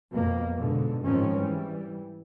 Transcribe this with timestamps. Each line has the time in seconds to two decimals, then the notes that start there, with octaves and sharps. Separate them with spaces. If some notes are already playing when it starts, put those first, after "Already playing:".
0.12 F2 B2 A#3
0.55 G#2 B2 D3
1.04 G#2 D#3 F3 C4 C#4
1.36 E3 G3